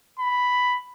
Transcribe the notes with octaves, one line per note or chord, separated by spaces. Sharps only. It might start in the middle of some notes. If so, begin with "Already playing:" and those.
B5